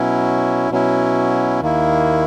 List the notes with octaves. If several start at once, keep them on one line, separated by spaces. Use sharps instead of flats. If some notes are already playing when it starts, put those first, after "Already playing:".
Already playing: B2 F#3 C#4 E4
B2 F#3 C#4 E4
D#2 D#3 A#3 E4